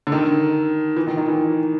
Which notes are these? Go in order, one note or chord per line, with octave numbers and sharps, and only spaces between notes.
D3
D#3
E3
D#3
D#3
E3